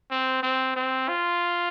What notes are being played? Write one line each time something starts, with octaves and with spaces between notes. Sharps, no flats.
C4
C4
C4
F4